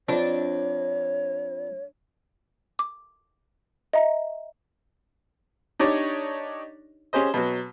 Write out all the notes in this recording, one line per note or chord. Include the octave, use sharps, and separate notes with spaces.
F2 D4 C#5
D6
D#5 E5 A#5
D4 D#4 G4 C#5 D5
C#4 G4 G#4 C5 D#5
B2 F#3